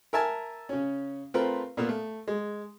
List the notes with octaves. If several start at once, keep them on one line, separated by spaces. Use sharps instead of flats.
A#4 E5 G#5 A5
C#3 C#4
A3 C4 F4 A#4 B4
A#2 A#3 B3
A3
G#3